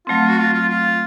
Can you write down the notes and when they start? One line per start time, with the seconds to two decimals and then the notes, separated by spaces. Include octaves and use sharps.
0.07 F#3 A3 C4 F4
0.29 F#4
0.38 F4
0.53 F4
0.69 F4